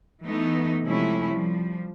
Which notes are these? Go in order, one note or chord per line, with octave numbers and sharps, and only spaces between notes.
E3 A3 B3 D#4
C3 F3 G#3 A3 C#4 E4
F3 G3